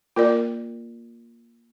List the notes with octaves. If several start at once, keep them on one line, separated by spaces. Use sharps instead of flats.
A#3 F4 A#4 D5